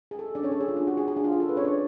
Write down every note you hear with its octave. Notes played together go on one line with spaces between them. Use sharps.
G#4
A4
D4 D5
C#4 C#5
A4
G#4
F4
D4
F#4
G#4
G#4
D4
F4
G#4
A4
B4
C#4 C#5
D4 D5